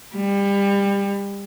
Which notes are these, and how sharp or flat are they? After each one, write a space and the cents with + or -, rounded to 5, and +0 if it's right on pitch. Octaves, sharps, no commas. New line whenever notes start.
G3 +25